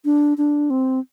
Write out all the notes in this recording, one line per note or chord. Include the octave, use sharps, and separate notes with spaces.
D4
D4
C4